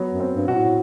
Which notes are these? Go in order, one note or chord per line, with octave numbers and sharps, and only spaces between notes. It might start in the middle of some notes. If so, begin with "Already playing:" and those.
Already playing: F#3 B3
F#2
C4
G2
B2 F#4
A2